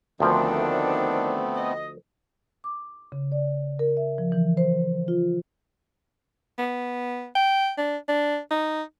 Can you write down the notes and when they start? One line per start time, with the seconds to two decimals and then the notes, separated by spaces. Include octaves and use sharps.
0.20 D2 D#3 F3 A3 B3 C4 D4 A#4
1.57 D#5
2.64 D6
3.12 C#3
3.32 D5
3.79 A#4
3.97 E5
4.18 F3
4.32 E3
4.57 C5
5.08 F4
6.58 B3
7.35 G5
7.78 D4
8.08 D4
8.51 D#4